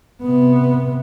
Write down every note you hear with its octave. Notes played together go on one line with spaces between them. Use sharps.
C3 B3